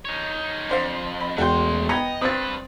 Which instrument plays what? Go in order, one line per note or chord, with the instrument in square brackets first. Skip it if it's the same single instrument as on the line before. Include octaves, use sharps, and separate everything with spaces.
[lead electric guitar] D#4 C#5
[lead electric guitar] F2 [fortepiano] D4 C5 F5
[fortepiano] B5
[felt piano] E1 G6 [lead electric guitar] A3 C6 [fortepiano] F#4 G5
[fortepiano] B3 A#5 B5 [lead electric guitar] D#5 [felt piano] G5 G#6 C#7
[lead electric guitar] G2 B4 [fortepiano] C4 [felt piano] D#6 A6